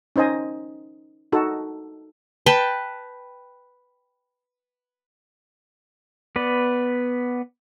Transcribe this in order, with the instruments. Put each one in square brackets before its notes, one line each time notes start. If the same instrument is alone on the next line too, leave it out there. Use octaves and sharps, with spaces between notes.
[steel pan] C#4 D#4 C5 D#5 G#5
D#4 F#4 A4
[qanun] B4 G5 A5
[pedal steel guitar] B3 B4 D5